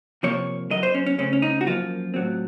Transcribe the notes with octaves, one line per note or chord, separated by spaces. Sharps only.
C3 F3 A#3 C#5
F#2 D#3 F#3 D#5
C5
C#4
C#4
C#3 A3 C4 C#4
C#4
D#4
F#4
F#2 F3 A#3 F4
A2 F#3 C4